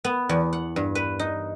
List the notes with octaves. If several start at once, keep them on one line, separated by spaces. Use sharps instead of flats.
B3
E2
F#5
G2
B4
D#4